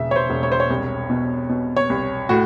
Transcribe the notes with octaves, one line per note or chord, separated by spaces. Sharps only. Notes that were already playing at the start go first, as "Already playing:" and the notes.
Already playing: E1 C#3 E5
C#5
C5
E1
C#5
C5
C#5
C2
B2
B2
C#5
C2
A2 F#4